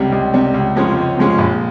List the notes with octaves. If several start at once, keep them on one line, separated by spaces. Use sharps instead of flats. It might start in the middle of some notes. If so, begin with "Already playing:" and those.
Already playing: C#2 C3 G3
C#2
C3 G3
C#2
C3 F3 G#3 C#4
C#2
C3 F3 G#3 C#4
A#1